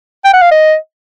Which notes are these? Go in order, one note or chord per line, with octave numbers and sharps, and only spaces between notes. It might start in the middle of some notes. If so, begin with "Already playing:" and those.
G5
F#5
F5
D#5